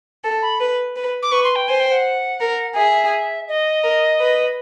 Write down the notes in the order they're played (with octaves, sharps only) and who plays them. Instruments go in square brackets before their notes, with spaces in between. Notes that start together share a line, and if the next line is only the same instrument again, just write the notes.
[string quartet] A4
[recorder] B5
[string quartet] B4
B4
[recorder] D6
[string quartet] B4 [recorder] C#6
[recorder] C6
G5
[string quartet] C5 [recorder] G#5
[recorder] G5
F#5
[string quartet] A#4
[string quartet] G#4 [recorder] E5
[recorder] D#5
[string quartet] A#4
B4